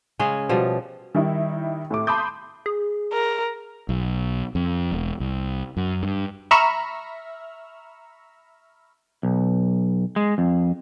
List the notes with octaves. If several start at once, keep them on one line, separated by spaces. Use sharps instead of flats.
C#3 G#3 C#4 G#4
B2 F3 G3
D#3 G3 D#4 E4
A2 A3 D6
A5 B5 C6 D6 D#6 G6
G#4
A#4
B1
F2
E1
C2
F#2
G2
E5 A#5 B5 C#6 E6 F6
B1
G#3
F2